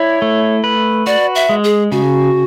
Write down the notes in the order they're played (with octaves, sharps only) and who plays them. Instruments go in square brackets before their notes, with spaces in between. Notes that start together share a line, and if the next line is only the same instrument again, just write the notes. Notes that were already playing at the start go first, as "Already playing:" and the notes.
Already playing: [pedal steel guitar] E4 D5 [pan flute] C#5
[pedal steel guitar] A3
B4
[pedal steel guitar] F#4 [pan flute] D5
[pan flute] E5
[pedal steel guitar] G#3
[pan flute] G#4
[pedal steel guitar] C#3 [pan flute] F#4